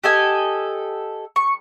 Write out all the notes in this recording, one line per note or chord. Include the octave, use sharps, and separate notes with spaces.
G4 A4 D#5 G#5
C#6